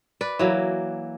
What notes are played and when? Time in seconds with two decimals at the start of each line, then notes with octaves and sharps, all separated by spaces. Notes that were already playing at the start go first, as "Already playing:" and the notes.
0.21 B4 D5
0.39 E3 F#3 A#3